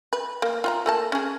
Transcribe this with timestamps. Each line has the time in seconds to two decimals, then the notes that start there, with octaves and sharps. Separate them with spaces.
0.13 B4
0.42 A#3
0.64 F4 F#5 A#5
0.86 A3 A#3 A5
1.12 C#4 G#4